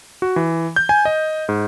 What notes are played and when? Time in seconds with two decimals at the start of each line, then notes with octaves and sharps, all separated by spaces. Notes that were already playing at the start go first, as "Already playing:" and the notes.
0.22 F#4
0.36 E3
0.76 G6
0.89 G#5
1.05 D#5
1.49 G#2